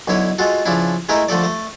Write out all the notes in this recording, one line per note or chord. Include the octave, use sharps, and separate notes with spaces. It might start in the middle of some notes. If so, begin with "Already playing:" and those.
B1 D3 E4 C#5
G#3 F4 F#4 A4
C#3 F3 D4 E4
G#3 A3 E4 A#4
D3 F3 A3 A4 D5
A3